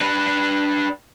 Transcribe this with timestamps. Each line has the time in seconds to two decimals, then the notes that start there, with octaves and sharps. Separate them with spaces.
0.01 D4 B4